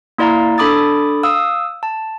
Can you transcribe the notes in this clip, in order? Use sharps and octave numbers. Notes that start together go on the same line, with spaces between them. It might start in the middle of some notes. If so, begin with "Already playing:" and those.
A#3 E4 D5 F5 A#5
D4 A4 B5 D6 D#6 A6
F5 D#6 E6
A5